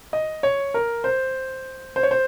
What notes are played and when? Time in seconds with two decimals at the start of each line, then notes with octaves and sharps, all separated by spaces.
0.13 D#5
0.43 C#5
0.74 A#4
1.04 C5
1.96 C5
2.03 C#5
2.11 C5